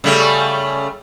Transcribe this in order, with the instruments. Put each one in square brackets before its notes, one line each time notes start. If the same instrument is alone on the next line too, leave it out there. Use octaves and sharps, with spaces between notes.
[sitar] C#3 G3 A3